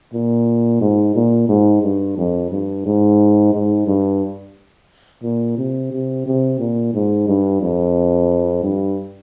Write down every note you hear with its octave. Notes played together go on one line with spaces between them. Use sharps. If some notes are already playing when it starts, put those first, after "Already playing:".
A#2
G#2
A#2
G#2
G2
F2
G2
G#2
G#2
G2
A#2
C3
C3
C3
A#2
G#2
G2
F2
G2